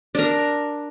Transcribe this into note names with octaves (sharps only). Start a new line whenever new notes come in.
D4 A#4